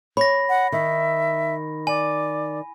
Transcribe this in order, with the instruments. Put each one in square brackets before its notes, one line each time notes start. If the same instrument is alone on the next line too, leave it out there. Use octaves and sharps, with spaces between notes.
[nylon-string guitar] C#5 [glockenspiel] B5 A#6
[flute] F#5
[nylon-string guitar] D#3 [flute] E5
[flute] D5 [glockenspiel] G#5